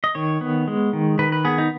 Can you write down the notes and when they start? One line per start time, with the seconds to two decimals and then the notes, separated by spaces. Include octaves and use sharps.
0.04 D#5
0.15 D#3 C#5
0.41 B3
0.68 G#3
0.93 D#3
1.19 D#3 B4
1.32 B4
1.45 B3 G#4
1.58 D#4